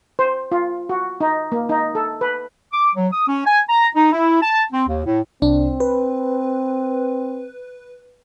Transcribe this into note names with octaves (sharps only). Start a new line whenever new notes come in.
C5
F4
F#4
D#4
A#3
D#4
A4
B4
D6
F#3
D#6
C#4
G#5
A#5
D#4
E4
A5
C4
D#2
A2
C2 C4 D4
B4